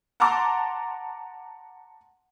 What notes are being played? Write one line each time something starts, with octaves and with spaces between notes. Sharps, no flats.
F#5 A5 A#5 C6 D6